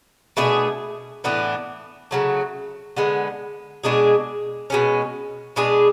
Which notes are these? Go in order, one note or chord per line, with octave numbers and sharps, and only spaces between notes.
B2 A3 D4 G#4
A2 E3 B3 D4
C#3 F#3 A3
D3 G#3 B3
B2 G#3 D4 G#4
B2 G#3 C#4
B2 G#3 D4 G#4